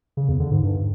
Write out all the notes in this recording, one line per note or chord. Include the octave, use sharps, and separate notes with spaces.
C#3
E2
D3
G#2
G2